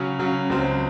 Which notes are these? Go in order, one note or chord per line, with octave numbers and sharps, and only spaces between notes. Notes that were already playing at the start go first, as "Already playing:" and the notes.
Already playing: C#3 F#3 C#4
C#3 F#3 C#4
C#2 C#3 F#3 C4